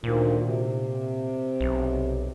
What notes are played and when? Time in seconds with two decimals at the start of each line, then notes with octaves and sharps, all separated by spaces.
0.04 D2 A#2 D#3 F3
0.45 C3
1.61 B1